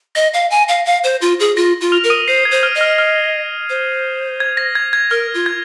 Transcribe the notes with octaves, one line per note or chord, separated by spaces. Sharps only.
D#5 A#6
F5
G#5
F5
F5
C5
F4
G#4
F4 A#6
F4
F6 F7
A#4
D#6 D#7
C5 C7
G#6
C5
F6
D#5
F6
F6
C5
G#6
A#6
G#6
G#6
A#4 F6
F4
G#6